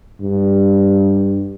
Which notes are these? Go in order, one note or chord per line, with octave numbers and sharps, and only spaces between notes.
G2